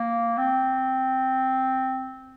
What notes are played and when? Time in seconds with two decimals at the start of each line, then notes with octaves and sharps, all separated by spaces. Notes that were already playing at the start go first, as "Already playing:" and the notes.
Already playing: A#3
0.37 C4